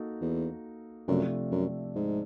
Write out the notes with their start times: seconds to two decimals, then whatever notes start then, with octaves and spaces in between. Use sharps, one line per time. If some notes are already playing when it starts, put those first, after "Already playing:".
Already playing: A#3 D#4 F#4 A4
0.21 E2
1.08 F#2 C3 F3 A3 D4
1.52 F#2
1.96 G#2